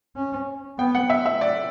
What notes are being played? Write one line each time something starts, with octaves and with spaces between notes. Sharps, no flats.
C#4
B3 G5
F#5
E5
E5
D5